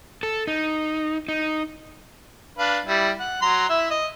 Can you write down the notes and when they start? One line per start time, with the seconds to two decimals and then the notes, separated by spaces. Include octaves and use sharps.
0.23 A4
0.47 D#4
1.28 D#4
2.58 D4 B4 F5
2.86 G3 E4
3.19 F#5
3.42 F#3 A#5 C6
3.69 E4 E5
3.91 D#5